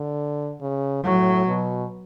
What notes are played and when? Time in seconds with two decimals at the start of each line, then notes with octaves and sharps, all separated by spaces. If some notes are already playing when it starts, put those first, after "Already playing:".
Already playing: D3
0.61 C#3
1.03 A2 F#3
1.46 B2